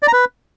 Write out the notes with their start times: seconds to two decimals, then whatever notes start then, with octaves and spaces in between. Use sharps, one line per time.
0.03 D5
0.08 A#5
0.13 B4